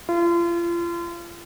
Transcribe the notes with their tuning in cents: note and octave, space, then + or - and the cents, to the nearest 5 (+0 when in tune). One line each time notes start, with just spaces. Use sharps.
F4 -35